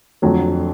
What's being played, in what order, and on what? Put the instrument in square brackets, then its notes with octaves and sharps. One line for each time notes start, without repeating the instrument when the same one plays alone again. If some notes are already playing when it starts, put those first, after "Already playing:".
[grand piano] F2 D3 F#3 A3